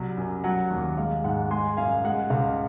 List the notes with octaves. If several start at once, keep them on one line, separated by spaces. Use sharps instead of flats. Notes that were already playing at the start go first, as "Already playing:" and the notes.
Already playing: C2 F#3
F#2
F#3 F#5
D#2
G#3 F5
G#2 F#5
G#3 G#5 C6
F#2 F5 G#5
G#3 F#5
C#2 F5